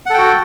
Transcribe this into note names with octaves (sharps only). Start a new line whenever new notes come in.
F#4 A4 F#5 G5